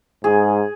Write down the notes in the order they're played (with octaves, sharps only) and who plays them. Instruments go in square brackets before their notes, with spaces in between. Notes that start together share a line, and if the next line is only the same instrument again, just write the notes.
[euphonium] G#2 [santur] G#4